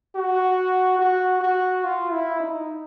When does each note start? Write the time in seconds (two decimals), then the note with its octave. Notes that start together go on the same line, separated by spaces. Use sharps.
0.15 F#4
0.99 F#4
1.41 F#4
1.84 F4
2.12 E4
2.40 D#4